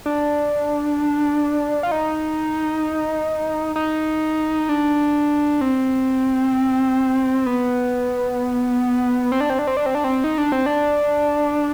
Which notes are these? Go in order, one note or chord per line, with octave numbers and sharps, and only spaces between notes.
D4
F4
D#4
D#4
D4
C4
B3
C4
D4
C4
D4
C4
D4
C4
D4
C4
D#4
D4
C4
D4